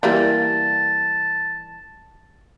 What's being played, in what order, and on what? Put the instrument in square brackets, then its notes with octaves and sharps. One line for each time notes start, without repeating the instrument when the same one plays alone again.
[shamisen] E3 G3 A#3 [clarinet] A5